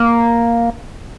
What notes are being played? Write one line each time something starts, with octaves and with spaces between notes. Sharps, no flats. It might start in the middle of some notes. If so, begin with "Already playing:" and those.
Already playing: A#3